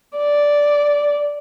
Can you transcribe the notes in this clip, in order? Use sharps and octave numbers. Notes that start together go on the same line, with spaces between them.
D5